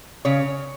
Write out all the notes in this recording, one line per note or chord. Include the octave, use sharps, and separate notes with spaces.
C#3 C#5